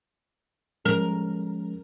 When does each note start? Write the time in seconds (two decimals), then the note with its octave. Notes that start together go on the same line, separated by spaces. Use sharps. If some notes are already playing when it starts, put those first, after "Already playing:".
0.85 F3 G#3 C#4 A#4